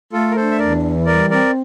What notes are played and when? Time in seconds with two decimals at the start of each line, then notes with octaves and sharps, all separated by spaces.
0.13 A3 F4 A4
0.31 A#4
0.36 D4 A4 C5
0.51 E5
0.59 E2 A#4 D5
0.83 E3
1.06 G3 A#4 D5
1.30 C4 A#4 D5